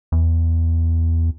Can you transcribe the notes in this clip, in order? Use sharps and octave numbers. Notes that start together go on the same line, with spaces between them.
E2